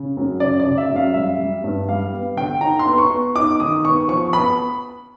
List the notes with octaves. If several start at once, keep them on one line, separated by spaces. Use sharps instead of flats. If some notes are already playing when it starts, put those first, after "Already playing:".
Already playing: C#3
F#2
C#3 D5
D5
C#3
E5
F#2
F5
G3 E5
G3
G2
G3 F5
B3
D3 G5
D#4 A#5
C6
B3
C#6
B3
D#4 D6
D#3 D#6
B3 C#6
F3 C#6
B3 B5